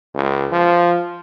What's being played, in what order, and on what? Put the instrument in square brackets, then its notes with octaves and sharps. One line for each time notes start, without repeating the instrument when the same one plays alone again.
[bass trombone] C#2
F3